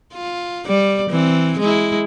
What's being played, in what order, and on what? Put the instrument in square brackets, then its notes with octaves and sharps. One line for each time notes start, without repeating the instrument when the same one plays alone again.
[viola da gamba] F4
G3 D5
E3 C4
G#3 E4